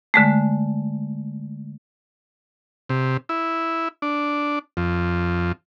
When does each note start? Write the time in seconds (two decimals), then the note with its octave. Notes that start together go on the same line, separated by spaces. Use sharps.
0.14 D3 G#3 A3
2.89 C3
3.29 E4
4.02 D4
4.77 F2